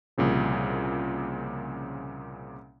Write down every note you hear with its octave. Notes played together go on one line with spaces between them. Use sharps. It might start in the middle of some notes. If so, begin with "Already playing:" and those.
C2 A#2 C#3 F3